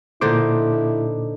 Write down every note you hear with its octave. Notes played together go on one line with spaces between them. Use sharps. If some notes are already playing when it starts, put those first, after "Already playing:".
A#2 D3 D#4 E4 C5 D6